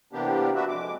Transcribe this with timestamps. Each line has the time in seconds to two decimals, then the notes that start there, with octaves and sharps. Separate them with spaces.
0.13 C3 E3 A#3 B3 D4 G4
0.56 D4 F#4 B4 E5
0.68 F2 G#3 D6